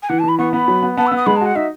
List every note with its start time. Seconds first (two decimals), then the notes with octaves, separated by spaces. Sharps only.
0.02 G#5
0.09 E3 F#5
0.19 A5
0.24 E3 B5
0.39 B3 C#6
0.53 B3 B5
0.68 F#3
0.83 B3
0.97 B3 A5
1.07 E6
1.11 B3 D#6
1.26 G#3 B5
1.36 A5
1.41 F#4 F#5
1.55 D#4 E5